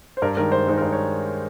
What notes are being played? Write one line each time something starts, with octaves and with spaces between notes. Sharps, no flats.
C5
G2 A#4
D#3 G#3 D#4 A#4
G2 C5
D#3 G#3 D#4 A#4
A#4
G2 C5
C#5